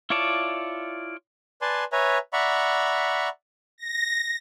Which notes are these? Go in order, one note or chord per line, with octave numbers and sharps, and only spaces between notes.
E4 F4 C#5 D5 A5
B4 D5 G#5 A5 C6
B4 C#5 E5 G#5 A#5
D5 E5 F#5 A#5 B5 C#6
A#6